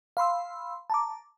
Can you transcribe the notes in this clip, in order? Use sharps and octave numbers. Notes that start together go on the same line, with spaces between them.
F5 B5 C6 E6
A5 A#5 D6